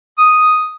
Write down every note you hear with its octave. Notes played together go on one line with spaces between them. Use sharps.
D#6